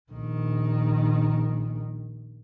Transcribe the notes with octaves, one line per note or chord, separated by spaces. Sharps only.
A#1 D#3